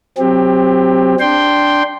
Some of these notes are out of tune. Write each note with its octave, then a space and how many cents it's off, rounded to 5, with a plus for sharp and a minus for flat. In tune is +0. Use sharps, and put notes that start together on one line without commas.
F#3 -5 C4 +0 G4 +25
D4 +0 G5 +0 C6 +0